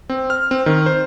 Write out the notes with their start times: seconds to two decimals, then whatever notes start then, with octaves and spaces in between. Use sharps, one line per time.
0.09 C4
0.30 F6
0.51 C4
0.66 D#3
0.86 C5